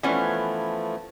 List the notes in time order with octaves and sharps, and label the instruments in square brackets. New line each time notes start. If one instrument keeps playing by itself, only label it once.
[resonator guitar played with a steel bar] E3 B3 C#4 [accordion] F3 A3